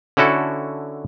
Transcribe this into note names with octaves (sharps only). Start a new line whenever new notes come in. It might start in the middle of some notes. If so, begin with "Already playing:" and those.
D3 C#4 E4 F#4 A4